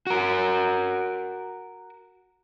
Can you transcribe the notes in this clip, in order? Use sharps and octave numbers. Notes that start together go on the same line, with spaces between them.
F#4 A#4